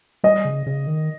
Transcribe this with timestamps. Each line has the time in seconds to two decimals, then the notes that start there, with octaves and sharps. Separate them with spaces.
0.24 G3 D#5
0.45 C#3
0.67 C#3
0.87 D#3